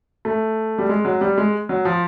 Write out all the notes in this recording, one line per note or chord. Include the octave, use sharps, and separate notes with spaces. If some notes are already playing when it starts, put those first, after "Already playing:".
A3
G3
G#3
F#3
G3
G#3
F#3
F3